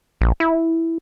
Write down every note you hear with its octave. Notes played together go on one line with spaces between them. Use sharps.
A#1
E4